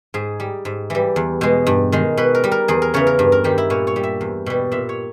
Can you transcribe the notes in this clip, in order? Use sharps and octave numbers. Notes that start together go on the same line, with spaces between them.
G#2 G#4
G3
G#2
E3 G3
E2
B2 G#3
G2
D#3 G#3
B2 B4
A#4
G3
A#4
E2 G#4
A#4
C#3 E3 C#5
A#4
G2
A#4
D#3 G3 G4
E4
A#2 C#5
C#5
G3
E5
E2
B2 G3
A#2 E5
C#5